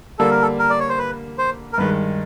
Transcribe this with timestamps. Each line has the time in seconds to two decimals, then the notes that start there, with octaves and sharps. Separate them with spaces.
0.19 D3 G3 A#3 A4
0.31 A#4
0.42 A4
0.59 A#4
0.70 D5
0.80 C#5
0.89 C5
0.99 B4
1.38 C5
1.73 A#4
1.78 G2 D#3 G#3 B4